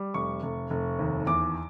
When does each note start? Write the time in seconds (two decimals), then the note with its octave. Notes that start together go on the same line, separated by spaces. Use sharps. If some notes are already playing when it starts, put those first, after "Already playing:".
Already playing: G3
0.14 F1 C#6
0.43 F1
0.70 F1
0.99 D#2
1.27 E2 D6